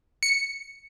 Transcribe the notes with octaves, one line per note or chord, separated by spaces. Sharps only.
C#7